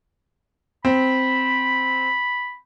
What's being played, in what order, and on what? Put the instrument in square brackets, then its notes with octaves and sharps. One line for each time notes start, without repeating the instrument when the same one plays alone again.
[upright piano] C4 [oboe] B5